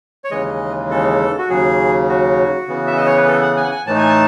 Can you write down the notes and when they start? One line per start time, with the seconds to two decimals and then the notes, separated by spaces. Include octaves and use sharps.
0.24 C#5
0.31 D#2 C#3 E3 G#3 D#5
0.90 A4
1.38 F#4
1.49 D#2 C#3 F#3 G#4
2.09 F#4
2.67 C#3 E3 B3
2.87 E5
2.97 D#5
3.06 C#5
3.17 B4
3.27 A4
3.42 F#5
3.57 G#5
3.64 F#5
3.72 G#5
3.86 A2 E3 A3 D#4 A5
3.98 G#5
4.09 A5